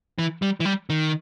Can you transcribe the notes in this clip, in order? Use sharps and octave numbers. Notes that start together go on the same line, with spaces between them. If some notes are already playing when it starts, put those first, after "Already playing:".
E3
G3
E3
G3
D#3